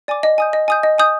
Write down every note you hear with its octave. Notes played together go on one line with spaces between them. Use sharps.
D5 G#5 D6
D#5
G#5 D#6 G6
D#5
G#5 D#6 G6
D#5
G#5 D#6 G6